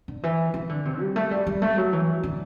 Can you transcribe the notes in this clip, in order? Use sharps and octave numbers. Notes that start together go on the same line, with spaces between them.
D3
E3
E3
D3
C3
G3
A3
G3
G3
A3
F#3
E3
D3